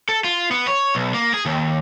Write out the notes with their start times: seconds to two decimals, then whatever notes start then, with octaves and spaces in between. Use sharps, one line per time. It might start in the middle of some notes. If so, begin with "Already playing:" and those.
0.09 A4
0.24 F4
0.51 B3
0.67 C#5
0.95 B1
1.14 A#3
1.34 G#4
1.46 D#2